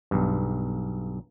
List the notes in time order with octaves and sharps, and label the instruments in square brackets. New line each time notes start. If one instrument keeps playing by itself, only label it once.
[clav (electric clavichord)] B1 G2